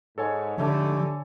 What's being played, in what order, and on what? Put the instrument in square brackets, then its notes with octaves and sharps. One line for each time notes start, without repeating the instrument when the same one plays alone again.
[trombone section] G#2 [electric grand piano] A4 C#5 G#5
[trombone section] G#2 G3 A3 [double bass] D3 [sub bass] F3